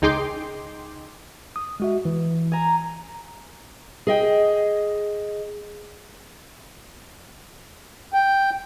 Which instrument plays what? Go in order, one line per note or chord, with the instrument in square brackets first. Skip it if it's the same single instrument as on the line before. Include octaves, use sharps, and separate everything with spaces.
[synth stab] C#2 D#4 G#4 G5 C6 D6
[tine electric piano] D#6
G#3 F#4 E5
E3
[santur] G#5 A#5
[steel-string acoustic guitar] G#4 D#5 G5
[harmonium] G5